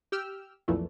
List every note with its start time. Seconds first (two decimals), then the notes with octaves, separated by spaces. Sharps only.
0.12 G4 G5 E6 F6
0.68 B1 F2 A#2 E3 A3